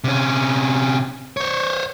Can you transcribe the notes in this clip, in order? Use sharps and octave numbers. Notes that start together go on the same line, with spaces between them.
C3 C#4
C5 C#5